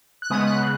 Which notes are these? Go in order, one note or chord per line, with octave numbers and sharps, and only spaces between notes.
F#6
C#3 G#3 B3 D#6
F#6
C#3